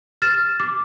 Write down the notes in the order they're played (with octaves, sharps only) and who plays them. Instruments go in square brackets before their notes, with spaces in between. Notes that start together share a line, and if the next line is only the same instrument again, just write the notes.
[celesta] F6 A6 E7
D6